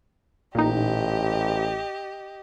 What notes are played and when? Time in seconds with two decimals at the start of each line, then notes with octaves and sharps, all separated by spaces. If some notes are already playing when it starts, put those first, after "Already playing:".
0.55 A1 A#2 D#4 G4 D#5